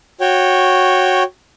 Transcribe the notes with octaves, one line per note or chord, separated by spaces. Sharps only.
F#4 C#5 G5